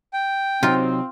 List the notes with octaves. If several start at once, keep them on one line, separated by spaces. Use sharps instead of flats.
G5
C3 F#3 C4 D#4 F4